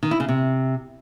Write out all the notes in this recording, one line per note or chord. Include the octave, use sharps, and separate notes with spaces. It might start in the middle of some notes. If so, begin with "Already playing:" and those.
D#3
E4
C#3
C3